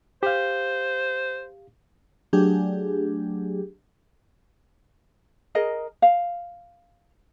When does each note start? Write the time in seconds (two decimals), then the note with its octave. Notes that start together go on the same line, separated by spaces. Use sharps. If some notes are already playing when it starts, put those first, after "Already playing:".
0.23 G4 C5 F5
2.33 F#3 A3 D4 G4 G#4
5.55 G#4 A#4 D#5
6.02 F5